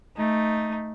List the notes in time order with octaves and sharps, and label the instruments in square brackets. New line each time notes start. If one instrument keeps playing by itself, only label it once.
[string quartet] A3 D#4